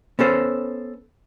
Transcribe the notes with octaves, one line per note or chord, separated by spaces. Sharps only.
B3 C#4 A4 C5